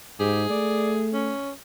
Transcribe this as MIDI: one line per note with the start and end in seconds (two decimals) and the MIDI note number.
0.20 0.46 44
0.20 0.43 67
0.20 1.21 68
0.50 1.33 57
0.50 0.93 74
1.13 1.51 61